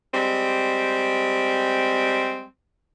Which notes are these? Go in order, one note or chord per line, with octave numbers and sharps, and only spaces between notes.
G3 G#3 C4